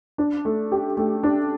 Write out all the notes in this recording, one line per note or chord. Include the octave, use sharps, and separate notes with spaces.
D4
A3
G4
A3
D4